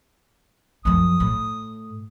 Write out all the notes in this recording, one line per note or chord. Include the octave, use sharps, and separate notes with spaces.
F#2 F3 D#6
A2